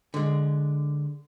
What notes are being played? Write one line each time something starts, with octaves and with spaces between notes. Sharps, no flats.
D3 G#3